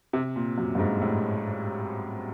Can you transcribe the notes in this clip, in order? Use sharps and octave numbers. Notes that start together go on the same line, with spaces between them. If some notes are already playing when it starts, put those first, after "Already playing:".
C3
A#2
F#2
G2
G#2
A2